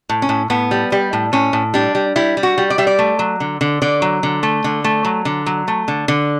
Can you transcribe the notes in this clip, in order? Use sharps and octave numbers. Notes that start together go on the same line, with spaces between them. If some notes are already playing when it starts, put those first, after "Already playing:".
A2
C#4
A2
A2 B3
G3
G3
A2
A2 C#4
A2
G3 D4
G3
G3 E4
G3
F#4
G3
D5
G3 E5
D5
A3
F#3
D3
D3
D3 D5
F#3
D3
A3
D3
A3
F#3
D3
F#3
A3
D3
D3